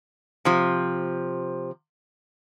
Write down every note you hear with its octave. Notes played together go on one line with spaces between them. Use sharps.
C3 F3